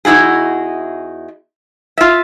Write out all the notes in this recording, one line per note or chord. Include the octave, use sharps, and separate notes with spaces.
E2 D#4 E4 F#4 G#4
F4 E5